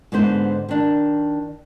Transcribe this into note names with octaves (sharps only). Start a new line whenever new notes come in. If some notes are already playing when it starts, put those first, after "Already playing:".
G#2 D3 B3 C5
D#3 D4